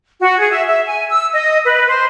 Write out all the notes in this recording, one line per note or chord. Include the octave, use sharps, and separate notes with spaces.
F#4
G#4
E5
E5
G#5
E6
D#5
B4
C5